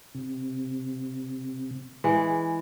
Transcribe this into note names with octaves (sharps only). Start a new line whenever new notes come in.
C3
E3 G#3